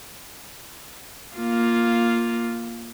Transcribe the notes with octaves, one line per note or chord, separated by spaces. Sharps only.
A#3 F4